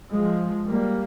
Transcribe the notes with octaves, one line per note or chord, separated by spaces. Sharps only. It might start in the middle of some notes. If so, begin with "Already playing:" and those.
F3 G#3
G3 A#3